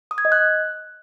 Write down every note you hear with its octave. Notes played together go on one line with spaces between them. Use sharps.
D#6
G#6
D#5
F#6